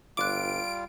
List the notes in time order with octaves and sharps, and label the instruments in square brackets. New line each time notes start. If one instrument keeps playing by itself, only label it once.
[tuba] G1 [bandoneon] G3 F4 [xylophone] D6 F#6 [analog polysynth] D7